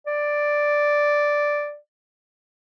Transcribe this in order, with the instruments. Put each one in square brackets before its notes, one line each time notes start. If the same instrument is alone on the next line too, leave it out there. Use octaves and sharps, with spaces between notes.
[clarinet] D5